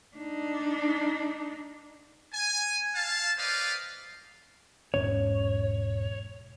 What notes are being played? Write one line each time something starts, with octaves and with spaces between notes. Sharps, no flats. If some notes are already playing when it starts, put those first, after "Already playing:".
D4 D#4
G#5
F5 A5
B4 C5 D5 D#5 F5
E1 G#2 C#4 C#5